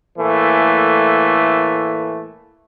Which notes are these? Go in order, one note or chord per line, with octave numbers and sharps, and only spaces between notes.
A2 E3 A3 A#3